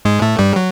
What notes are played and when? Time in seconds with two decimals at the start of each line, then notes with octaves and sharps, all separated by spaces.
0.05 G#2 G#3
0.22 A2 A3
0.39 G2 G3
0.56 F#3